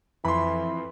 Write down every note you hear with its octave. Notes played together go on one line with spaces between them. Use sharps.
F2 E3 B5 C6